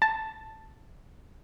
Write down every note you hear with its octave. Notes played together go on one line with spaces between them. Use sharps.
A5